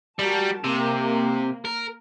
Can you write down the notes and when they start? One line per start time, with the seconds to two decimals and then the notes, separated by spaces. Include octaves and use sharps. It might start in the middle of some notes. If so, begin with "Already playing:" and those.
0.19 G3 F#4 A#4 A5
0.64 C3 A#3
1.65 A#4